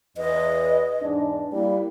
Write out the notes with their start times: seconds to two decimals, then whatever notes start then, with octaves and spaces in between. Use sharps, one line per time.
0.17 E2 B4 D#5
1.02 E2 G#2 D4
1.53 G3 A#3 E4